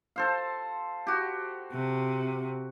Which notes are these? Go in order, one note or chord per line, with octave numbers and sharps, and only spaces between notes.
A4 C5 F5
F#4 G4
C3